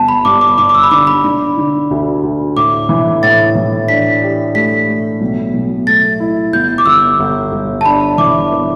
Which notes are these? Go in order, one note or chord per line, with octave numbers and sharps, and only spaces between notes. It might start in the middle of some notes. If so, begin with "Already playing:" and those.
Already playing: G1 A5
B5
G2 D6
D6
G2 D6
D6
E6
B5
D3 D6
B5
D3
D3
D2
D2
A2 D6
E3
A2 A6
E3
D4 B6
G4
A3 B6
A3
B1
B1
A3 A6
E4
G1 G6
D6
G1 E6
G1
G1
A5
D4 B5
E3 D6
B3